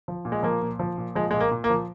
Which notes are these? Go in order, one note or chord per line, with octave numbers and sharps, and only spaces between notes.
F3
A#2
G#3
F3 A#3
A#2
F3
A#2
F3 G#3
A#2 G#3
A#3
A#2
A#3
F3